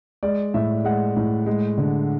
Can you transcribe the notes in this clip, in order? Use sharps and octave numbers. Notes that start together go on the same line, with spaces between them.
G#3 D5
A2 E5
G#3 F#5
A2
G#3
D3